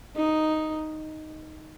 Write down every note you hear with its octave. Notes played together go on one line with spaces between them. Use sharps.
D#4